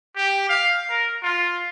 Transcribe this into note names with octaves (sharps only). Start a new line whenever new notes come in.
G4
F5
A#4
F4